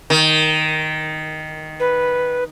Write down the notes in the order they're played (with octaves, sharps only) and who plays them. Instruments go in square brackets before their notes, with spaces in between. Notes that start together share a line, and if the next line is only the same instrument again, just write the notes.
[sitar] D#3
[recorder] B4